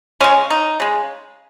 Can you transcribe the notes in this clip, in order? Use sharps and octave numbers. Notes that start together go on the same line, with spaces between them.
C#3 G#3 C#4
D#4
C#3 G#3